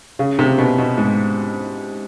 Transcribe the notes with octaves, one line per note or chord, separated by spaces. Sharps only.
C#3
C3
B2
B2
G#2